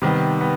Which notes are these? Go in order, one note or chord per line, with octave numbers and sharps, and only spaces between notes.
C3 D#3 G3 B3
B3